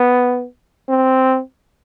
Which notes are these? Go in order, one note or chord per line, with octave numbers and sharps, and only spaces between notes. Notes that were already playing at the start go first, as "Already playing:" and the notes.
Already playing: B3
C4